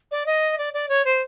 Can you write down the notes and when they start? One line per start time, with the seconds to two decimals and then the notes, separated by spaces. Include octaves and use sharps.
0.11 D5
0.26 D#5
0.58 D5
0.73 D5
0.88 C#5
1.04 C5